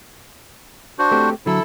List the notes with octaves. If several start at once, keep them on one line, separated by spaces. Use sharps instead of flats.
D4 F#4 C5
A3 C4 G4
D3 F#3 E4 A4